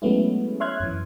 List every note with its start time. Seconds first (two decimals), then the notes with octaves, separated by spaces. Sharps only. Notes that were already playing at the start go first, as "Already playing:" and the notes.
0.02 F#3 G#3 A3 B3 C#4 E4
0.60 C#5 E5 C6 F6 F#6 G#6
0.80 F#2 E3